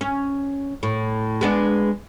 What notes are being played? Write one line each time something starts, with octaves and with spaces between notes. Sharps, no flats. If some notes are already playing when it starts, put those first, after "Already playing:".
C#4
A2
G#3 B3 D4